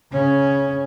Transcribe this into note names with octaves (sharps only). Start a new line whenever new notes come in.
C#3 C#4